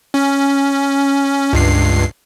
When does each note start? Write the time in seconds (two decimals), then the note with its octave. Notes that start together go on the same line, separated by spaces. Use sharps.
0.14 C#4
1.53 C#2 G2 C7